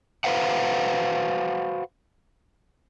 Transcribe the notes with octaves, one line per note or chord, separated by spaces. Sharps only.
F#4 B4 C5 F5 F#5